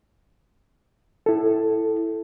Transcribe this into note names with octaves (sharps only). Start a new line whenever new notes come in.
E4 A4